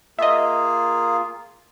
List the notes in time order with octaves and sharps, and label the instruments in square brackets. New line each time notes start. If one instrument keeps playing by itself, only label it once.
[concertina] A#3 F4 G#4 [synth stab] D#5 E5